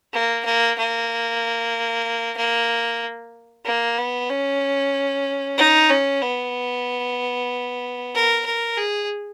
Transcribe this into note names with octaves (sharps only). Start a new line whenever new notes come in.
A#3
A#3
A#3
A#3
A#3
B3
C#4
D#4
C#4
B3
A#4
A#4
G#4